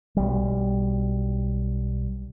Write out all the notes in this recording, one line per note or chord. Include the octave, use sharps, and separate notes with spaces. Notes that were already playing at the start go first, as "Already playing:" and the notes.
B1 G3